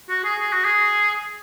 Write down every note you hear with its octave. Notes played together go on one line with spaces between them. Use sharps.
F#4
G#4
G#4
F#4
G#4